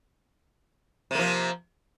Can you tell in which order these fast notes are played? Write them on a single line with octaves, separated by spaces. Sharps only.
C3 A#3 F3